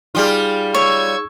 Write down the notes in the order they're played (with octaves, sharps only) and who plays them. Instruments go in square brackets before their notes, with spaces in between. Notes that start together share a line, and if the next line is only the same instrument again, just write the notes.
[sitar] G3 F4 [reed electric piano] D#4 G#4
[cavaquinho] C#5 [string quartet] C#6 E6 G#6